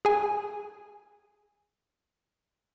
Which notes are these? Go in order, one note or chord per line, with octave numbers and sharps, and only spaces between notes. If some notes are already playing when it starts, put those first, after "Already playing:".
G#4 G#5